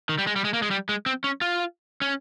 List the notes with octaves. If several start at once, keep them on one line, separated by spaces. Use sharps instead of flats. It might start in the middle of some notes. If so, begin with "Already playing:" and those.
D#3
G3
G#3
G3
G#3
A#3
G#3
G3
G#3
C4
C#4
F4
C#4